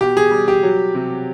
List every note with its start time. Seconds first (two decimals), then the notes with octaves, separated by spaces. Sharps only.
0.01 B2 G4
0.17 G#4
0.31 G3
0.48 G4
0.63 F#3
0.95 C3